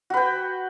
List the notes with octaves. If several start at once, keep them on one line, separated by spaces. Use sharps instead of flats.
F#4 B4 G5